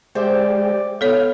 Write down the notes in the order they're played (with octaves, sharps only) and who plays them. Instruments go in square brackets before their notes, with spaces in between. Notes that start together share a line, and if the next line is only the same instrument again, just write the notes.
[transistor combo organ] G#3 G4 [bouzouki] C5 E5 G5 [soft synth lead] D5
[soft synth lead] B3 [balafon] A4 C#5 [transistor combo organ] F5